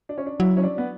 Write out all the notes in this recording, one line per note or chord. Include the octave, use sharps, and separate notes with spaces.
D4
C#4
D4
F#3 E4
C#4
D4
B3